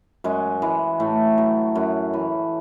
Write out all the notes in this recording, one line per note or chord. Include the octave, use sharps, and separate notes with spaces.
F#2 G#3
E3 G#3
A2 A3
F#3
F#2
E3